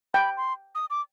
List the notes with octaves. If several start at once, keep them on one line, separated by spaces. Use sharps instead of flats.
G5 B5
C6
D#6
D6